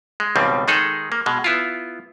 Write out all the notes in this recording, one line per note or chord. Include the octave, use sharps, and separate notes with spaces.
G#3
C#2 B2 D#3 G3 C4
D#3 G#3 D#4 G#4 A4
A#3
B2 G#3
B3 E4 F4